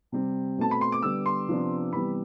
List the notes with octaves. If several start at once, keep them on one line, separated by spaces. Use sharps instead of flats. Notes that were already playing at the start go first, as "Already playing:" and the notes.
C3 G3 C4
B2 A3 C4 A5
B5
C6
D6
D3 G3 B3 E6
C6
C3 F3 B3 D4
C3 E3 G3 B3 B5